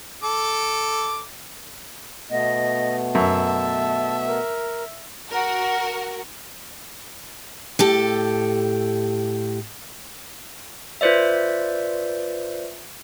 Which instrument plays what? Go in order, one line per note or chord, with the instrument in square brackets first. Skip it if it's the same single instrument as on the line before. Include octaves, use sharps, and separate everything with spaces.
[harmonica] A4 D6
[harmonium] B2 A3 B3 [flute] D#5
[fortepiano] F#2 [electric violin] E5 [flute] A5
[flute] A#4
[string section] F#4 A#4
[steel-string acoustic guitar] A2 G4 A4
[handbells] F4 B4 C5 D5 E5